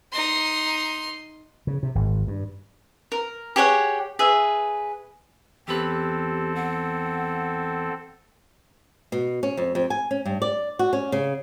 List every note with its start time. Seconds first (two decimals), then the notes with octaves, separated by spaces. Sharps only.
0.12 D#4 C6
1.67 C#3
1.83 C3
1.95 G#1
2.27 G2
3.12 A#4
3.56 G4 G#4 C#5 F#5
4.19 G#4 B4 E5
5.68 E2 C4 G4 A4 B4
6.55 F#5
9.12 B2
9.43 C#4
9.57 F2
9.75 F2
9.90 G#5
10.11 C#4
10.25 G2
10.42 D5
10.79 F#4
10.93 C#4
11.12 C#3